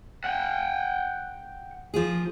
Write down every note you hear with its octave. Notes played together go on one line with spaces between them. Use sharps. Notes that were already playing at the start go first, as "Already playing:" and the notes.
F#5 G5
F3 A#3 G#4